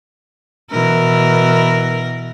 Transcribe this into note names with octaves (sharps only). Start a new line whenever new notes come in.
B2 E3 A#4